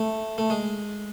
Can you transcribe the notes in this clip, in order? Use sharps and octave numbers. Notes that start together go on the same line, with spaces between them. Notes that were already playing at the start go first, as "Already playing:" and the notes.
Already playing: A3
A3
G#3